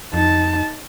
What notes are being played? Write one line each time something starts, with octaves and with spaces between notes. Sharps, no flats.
F2 D#4 A5